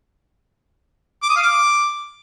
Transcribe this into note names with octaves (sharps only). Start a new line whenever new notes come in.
D6
D#6
F5
D6